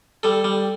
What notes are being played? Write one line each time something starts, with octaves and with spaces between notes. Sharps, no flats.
G3 A4
G3